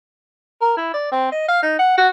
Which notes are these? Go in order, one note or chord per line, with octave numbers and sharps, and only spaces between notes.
A#4
E4
D5
C4
D#5
F5
D#4
F#5
F#4